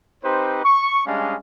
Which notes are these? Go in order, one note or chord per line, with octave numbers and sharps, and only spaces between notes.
C4 D#4 G4 B4 C5
C#6
G3 G#3 C#4 D4 D#5 F5